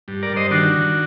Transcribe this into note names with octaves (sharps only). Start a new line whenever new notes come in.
G2
A#4 D5
G2
C5 D#5
D#3 D4 F#4
D#3